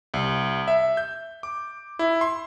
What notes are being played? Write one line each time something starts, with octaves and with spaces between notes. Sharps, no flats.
C2
E5
G6
D6
E4
C6